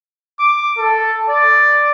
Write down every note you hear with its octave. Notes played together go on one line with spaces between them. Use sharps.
D6
A4
D5